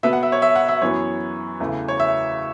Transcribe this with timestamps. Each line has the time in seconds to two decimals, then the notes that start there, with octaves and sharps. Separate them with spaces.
0.03 B2 B3 E5
0.13 F#5
0.23 E5
0.32 C#5
0.42 E5
0.56 F#5
0.68 E5
0.82 F#2 E3 B3 C#5
1.60 E2 C#3 E3 A3
1.88 C#5
2.00 E5